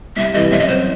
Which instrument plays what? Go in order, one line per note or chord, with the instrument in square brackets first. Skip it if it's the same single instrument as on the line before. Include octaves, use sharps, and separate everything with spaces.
[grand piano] C2 [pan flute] E5
[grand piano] C3 E3 G3 [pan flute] D#5
[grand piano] F#2 [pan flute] E5
[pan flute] D#5
[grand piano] F#3 [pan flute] C5
[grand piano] C4